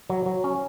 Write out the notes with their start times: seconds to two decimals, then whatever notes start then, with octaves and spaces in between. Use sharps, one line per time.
0.10 F#3
0.26 F#3
0.44 C#4